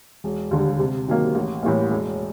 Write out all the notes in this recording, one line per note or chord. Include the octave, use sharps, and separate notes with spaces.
E1
D#2 D3 G3
C3
D#3 F#3 A#3
A1
A2 E3 G3 A#3
E1